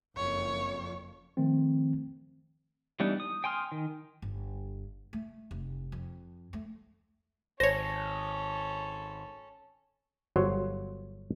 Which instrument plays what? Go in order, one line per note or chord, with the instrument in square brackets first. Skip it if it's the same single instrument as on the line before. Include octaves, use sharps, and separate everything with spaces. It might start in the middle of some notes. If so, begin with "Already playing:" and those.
[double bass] F#1 [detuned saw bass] F2 [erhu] C#5
[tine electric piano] D#3 F3 A3 C4
[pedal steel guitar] E3 G3 B3 D4 D#4
D#6
G5 G#5 C6 D#6 F6
D#3
[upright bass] G1
A3
F1
F2
A3
[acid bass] G#1 [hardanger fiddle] C#4 A4 [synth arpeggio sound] C5 C#5 [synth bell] A#6
[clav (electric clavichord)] G1 F#3 C5 C#5